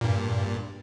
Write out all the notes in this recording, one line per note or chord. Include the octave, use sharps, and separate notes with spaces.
G2 A#2